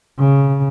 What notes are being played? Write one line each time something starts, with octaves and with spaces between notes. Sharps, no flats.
C#3